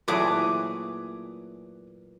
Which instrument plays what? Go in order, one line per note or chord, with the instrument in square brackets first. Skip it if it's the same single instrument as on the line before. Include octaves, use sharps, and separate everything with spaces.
[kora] A#2 E3 F#3 [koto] A3 G#4 B4 [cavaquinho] D6 D#6